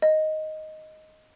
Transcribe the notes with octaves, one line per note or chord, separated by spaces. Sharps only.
D#5